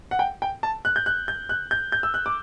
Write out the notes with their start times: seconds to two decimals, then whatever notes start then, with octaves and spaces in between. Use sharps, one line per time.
0.11 F#5
0.19 G5
0.42 G5
0.63 A5
0.85 F#6
0.96 G6
1.06 F#6
1.28 G6
1.49 F#6
1.71 G6
1.92 G6
2.03 E6
2.14 F#6
2.26 D6